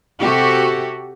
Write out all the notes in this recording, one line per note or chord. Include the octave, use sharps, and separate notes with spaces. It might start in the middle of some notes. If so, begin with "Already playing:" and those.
C3 F#4 G4 A4